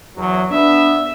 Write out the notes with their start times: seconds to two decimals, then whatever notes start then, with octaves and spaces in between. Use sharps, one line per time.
0.16 E2 F#3
0.51 B3 D4 E5